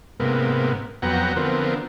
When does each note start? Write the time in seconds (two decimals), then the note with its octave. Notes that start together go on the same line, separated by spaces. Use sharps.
0.20 G#2 C3 A#3 B3
1.02 F2 F#3 B3 F#5 G5 A#5
1.36 D3 F3 B3 C4 A#4